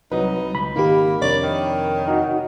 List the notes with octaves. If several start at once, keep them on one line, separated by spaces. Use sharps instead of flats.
C2 F#3 D#4 B4
C#2 B5
G#1 D#3 A#3 D#4 G4
F2 C3 D4 A#4 C#5 D5
D#3
D#4 F#4